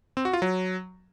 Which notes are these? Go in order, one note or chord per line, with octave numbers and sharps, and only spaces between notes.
C4
F#4
F4
F#3